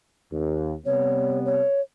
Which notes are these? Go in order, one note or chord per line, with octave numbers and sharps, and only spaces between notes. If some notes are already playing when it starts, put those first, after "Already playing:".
D#2
C3 G3 B3 C#5
C#5